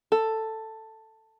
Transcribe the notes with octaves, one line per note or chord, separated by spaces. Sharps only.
A4